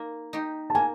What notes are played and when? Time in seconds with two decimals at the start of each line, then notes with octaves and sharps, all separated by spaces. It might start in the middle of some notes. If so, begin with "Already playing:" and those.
Already playing: A#3 D#4
0.33 D#4 G4
0.70 A5
0.75 A#3 G#5